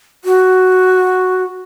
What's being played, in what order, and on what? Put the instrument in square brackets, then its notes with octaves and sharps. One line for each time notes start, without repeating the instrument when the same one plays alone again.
[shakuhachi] F#4